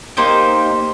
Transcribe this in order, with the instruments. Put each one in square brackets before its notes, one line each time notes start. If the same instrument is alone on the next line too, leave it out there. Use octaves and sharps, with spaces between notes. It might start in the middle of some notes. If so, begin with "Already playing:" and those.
[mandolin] A#3 D#4 G4 C5